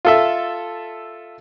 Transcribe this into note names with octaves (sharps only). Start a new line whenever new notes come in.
F4 A4 E5